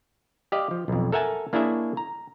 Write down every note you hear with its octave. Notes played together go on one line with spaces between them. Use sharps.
G4 D5 D#5 F5
F3
B1 F2
A4 A#4 E5 F#5 G#5 A5
A#3 D4 E4 G#4 C#5 E5
A#5